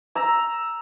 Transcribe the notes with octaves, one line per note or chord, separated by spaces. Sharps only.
A#5 E6